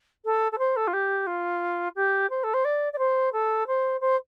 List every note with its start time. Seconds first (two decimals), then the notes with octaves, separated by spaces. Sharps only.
0.25 A4
0.52 A4
0.59 C5
0.76 A4
0.87 F4
0.93 G4
1.27 F4
1.96 G4
2.30 C5
2.44 A4
2.54 C5
2.65 D5
2.93 D5
2.98 C5
3.33 A4
3.67 C5
4.01 C5